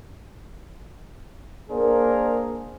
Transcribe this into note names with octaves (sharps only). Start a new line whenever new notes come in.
A#3 D4 G#4 A#4 C5